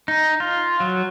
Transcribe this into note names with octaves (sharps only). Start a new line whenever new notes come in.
D#4
F4
F#3